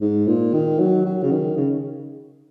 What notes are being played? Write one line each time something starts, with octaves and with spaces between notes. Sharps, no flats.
G#2
A#2
D#3
F#3
F#3
C#3
D#3
C#3